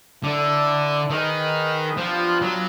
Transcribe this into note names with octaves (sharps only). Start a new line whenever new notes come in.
D3 E4 A4 D5
D#3 D#4 G#4 B4 D#5
F3 G3 B3 D4 F4
F#3